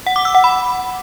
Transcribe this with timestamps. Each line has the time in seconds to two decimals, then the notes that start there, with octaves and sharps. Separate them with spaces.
0.07 F#5
0.16 D6
0.25 E6
0.35 F#5
0.44 B5